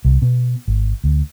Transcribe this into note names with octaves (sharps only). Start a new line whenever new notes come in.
C2
B2
G#1
D2